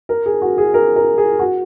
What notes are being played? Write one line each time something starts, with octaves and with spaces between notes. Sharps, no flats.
A#4
G#4
F#4
G#4
A#4
A#4
G#4
F#4